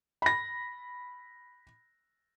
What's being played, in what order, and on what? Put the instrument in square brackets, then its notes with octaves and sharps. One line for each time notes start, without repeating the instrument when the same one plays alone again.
[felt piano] B5 A#6